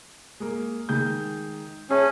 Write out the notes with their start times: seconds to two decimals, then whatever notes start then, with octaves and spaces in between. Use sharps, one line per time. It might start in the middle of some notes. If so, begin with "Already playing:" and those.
0.40 G#3 A#3
0.89 D#3 G#3 G6
1.90 C#4 G#4 E5 A5